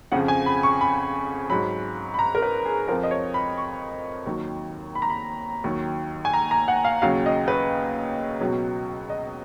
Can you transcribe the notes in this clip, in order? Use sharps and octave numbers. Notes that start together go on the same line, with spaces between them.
F2 C#3 F3 F#5
G#5
B5
C#6
B5
G#2 F#3 B5
B5
A#5
A#4
B4
G#4
F2 F3 A#4
D#5
C#5
B5
C#6
D#2 D#3 F#3
B5
A#5
B5
D#2 D#3 F#3
G#5
A#5
A#5
F#5
F5
D#2 C#3 F#3 F5
D#5
B4
C#2 B2 F#3
D#5